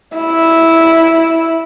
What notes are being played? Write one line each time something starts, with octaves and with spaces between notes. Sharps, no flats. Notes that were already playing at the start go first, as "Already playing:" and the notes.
E4